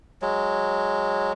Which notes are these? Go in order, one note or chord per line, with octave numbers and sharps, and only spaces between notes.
F#3 G#3